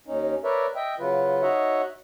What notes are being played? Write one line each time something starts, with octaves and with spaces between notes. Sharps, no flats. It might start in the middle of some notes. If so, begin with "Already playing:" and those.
D#2 C#4 D#4
A#4 B4 C#5 D5 E5
D#5 E5 G5
C#3 F#3 F4 B4
D#4 F#4 C#5 D#5 E5 F#5